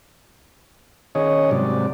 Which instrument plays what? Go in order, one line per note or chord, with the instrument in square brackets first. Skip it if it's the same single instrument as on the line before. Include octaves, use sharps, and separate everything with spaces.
[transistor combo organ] D#3 C#4 G#4 C#5 D#5
G#2 C3 F#3 G3 D5